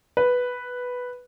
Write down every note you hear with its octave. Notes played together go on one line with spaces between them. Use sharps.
B4